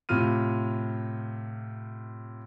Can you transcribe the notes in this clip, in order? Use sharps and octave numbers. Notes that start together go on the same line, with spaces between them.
A2 C3 F4 F6 D#7